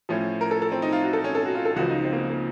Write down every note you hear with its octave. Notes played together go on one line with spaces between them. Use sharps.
A2 F3 C#4
A#4
A4
A4
C4
D#4
F4
F#4
A4
C#4
A4
F#4
F4
A4
C#2 C#3 F3 F#4
D#4
C4
A#3
A#3